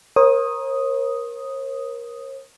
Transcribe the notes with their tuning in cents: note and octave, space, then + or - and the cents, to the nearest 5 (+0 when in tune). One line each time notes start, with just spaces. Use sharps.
A#4 +20 C#5 -45 D#6 +0